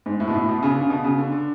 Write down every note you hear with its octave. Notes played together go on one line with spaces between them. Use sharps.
G#2
A2
B2
A2
B2
C#3
D3
C#3
B2
C#3
D3
D3